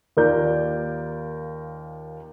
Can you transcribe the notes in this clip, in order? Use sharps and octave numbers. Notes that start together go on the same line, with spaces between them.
D#2 F4 A#4 D5 G6